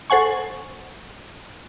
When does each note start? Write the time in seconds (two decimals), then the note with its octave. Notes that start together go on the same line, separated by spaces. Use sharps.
0.10 A4 C5 F#5 G#5 C#6